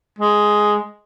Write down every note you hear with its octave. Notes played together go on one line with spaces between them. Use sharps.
G#3